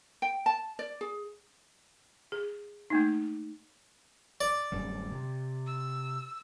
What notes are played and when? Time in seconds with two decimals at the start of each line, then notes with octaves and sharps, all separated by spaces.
0.22 G5
0.46 A5
0.79 D5
1.01 G#4
2.32 G#4
2.90 A3 A#3 D#4
4.41 D5
4.72 D1 F#2 G3
5.11 C3
5.67 E6